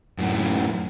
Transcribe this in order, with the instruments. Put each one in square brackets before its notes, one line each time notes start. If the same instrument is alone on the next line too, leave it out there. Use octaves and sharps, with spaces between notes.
[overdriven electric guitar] F#2 A2